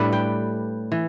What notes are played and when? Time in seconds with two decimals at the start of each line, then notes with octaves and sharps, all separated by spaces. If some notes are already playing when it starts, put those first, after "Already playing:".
Already playing: A2 G3 D4 A4 B4
0.13 G5
0.92 E3